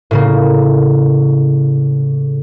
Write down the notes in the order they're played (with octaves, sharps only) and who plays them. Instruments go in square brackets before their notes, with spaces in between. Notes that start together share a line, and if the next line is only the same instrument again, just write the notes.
[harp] A2 C#3 A#3